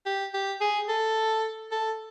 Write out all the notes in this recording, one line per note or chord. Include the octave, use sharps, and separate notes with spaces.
G4
G4
G#4
A4
A4